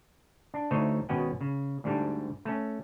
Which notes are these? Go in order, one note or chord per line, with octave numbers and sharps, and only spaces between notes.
D4
D2 A3 D#4 C5 C#5 D#5
G#1 B2 C#4 D#5 F#5 G5
C#3
D2 G#2 D3 G3 D4
A3 C#4